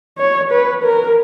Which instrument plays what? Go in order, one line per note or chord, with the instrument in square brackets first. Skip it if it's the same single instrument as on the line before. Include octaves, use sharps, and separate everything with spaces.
[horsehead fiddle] C#5
B4
A#4